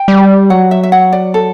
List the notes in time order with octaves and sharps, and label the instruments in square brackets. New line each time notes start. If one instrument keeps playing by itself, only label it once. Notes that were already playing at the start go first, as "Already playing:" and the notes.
Already playing: [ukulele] G5
[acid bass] G3
[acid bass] F#3 [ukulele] F#5
[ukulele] E5
E5
F#5
D5
A4